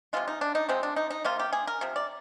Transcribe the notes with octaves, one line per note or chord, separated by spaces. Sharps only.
C3 F3 G#3 F4
D#4
D4
D#4
C3 F3 G#3 C4
D4
D#4
D#4
C3 F3 A#3 F4
G4
G#4
A#4
C3 F3
D5